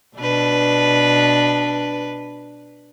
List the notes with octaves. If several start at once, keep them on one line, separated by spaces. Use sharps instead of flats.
B2 D4 B4